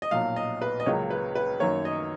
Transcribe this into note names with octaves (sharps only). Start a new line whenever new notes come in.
D#5
B1 A#2 F#3 F5
D#5
B4
D#5
C#2 C#3 F#3 A#3 C#5
B4
B4
F#2 D#3 A#3 C#5
D#5